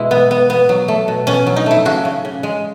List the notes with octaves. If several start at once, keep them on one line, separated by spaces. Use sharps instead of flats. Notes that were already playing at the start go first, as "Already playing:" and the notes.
Already playing: B2 G#3 E4 G#4
B3
B3
B3
F#3
A3
B2
B2 C#4
F#3
D#4
A3 E4
C#3 F#4
C#3
C#3
G#3